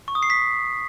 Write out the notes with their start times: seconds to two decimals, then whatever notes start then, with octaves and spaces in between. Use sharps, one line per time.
0.08 C#6
0.15 D#6
0.23 C7
0.30 B6